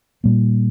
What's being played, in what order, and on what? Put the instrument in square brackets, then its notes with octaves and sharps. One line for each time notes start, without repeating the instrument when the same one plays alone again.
[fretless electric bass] A#2 G3 A#3